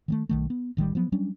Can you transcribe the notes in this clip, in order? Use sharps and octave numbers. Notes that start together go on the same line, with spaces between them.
D#3 G3 A3
B1 D#3 A3
B3
A1 D#3 F3 G3
F3 F#3 B3
F#3 G3 C#4 D4